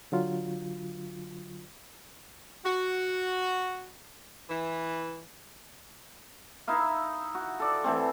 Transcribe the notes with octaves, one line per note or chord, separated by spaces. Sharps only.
D3 F#3 F4
F#4
E3
D#4 E4 E5 F5
F#4
A4 D5
E3 A3 C4